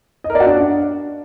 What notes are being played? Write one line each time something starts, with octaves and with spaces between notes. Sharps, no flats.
D#5
A#4
D5
F#4
D4